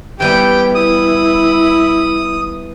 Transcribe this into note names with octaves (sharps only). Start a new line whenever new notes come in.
E3 G3 B3 G4 G5
E4 D#6